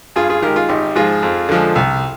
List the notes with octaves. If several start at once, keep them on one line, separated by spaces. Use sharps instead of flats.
G2 F4 G#4
F4 G#4
D#3 G#3 G4 A#4
F4 G#4
G#1 D#4 G4
G#2 F3 F4 G#4
F2
D3 F3 G#3
C2